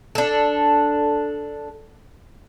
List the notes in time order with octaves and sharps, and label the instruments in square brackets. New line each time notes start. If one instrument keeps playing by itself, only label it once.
[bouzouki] D4 A4